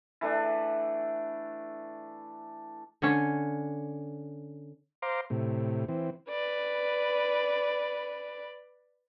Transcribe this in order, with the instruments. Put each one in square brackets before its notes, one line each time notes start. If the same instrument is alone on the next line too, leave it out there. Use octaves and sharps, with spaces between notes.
[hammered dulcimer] E3 A3 D4
[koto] D3 C#4
[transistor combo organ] C5 F5 A#5 C6 D6
A2 C3
E3 C4
[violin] B4 D5